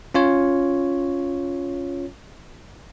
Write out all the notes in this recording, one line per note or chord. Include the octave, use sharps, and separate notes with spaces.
C#4 F4 C#5